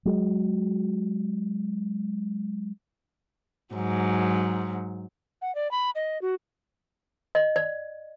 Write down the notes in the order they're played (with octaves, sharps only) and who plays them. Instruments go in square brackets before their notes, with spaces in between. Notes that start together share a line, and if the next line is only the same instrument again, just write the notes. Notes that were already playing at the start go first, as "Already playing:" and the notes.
[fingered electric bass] F#3 G#3
[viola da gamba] G#2 F#3
[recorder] F#5
D5
B5
D#5
F#4
[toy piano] D#5
D5